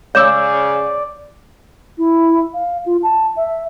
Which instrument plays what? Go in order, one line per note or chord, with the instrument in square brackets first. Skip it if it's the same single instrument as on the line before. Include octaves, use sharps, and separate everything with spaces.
[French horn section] C#3 [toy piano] C#5 D6 E6 [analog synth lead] D5 [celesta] G6 E7
[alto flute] E4
F5
F4
A5
E5